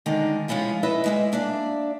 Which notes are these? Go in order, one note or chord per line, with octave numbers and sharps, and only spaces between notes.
D3 D#3 G#3 A#4
F3 G#3 C#4 E4 F4
E4 B4 D#5 E5
G3 G#3 E5
A#3 D4 D5 E5